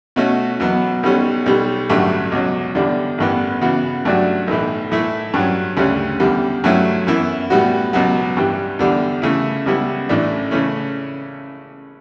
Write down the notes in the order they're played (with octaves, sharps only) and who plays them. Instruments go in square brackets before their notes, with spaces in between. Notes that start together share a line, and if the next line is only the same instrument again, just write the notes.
[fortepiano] B2 A3 C#4 F#4
E2 B2 F#3 B3
B1 B2 G3 C#4
B1 B2 G3
A1 G2 D3 F#3 A3
C#2 B2 F#3 C#4
E2 D3 G3 D4
A1 G2 E3 B3
C#3 E3 B3 F#4
G2 F#3 A3 D4 F#4
B1 A2 E3
A2 E3 A3 E4
G2 F#3 C#4
D2 C#3 G3 C#4
E2 D3 G3
G2 F#3 A3 C#4 E4
F#2 E3 B3 E4
A2 G3 B3 F#4
C#2 B2 F#3 B3
G2 E3 G3
E2 D3 G3 D4
C#3 E3 A3 E4
C#2 C#3 G3 B3 E4
A1 A2 E3 A3 D4
C#3 E3 A3 C#4